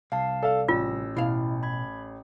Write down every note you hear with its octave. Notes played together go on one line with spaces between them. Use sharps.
C2 F5 A5 C7
A4 D5 F5
A1 F4 E6 A#6
B2 E4 F5
B5 G#6